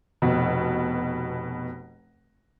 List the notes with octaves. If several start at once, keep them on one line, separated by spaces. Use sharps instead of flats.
F1 B2